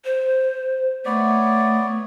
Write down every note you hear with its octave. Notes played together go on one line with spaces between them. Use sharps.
C5
A3 B3 C#5 D5